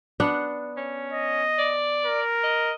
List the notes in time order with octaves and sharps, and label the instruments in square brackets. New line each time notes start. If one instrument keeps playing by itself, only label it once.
[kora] B3 D4 F#5
[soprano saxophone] C#4
[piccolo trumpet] D#5
[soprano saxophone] D5
[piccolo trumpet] A#4
[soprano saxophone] D#5